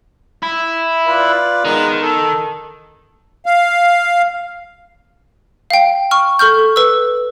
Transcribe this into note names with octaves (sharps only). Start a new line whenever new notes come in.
E4
F4 B4 D5
D#3 G#3 B3 A#5
A4
F5
F5 G5
C#6 F6
A4 C#6 F6 G6
B4 E6